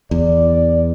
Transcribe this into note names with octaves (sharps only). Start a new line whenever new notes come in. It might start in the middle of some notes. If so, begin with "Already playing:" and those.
E2 D5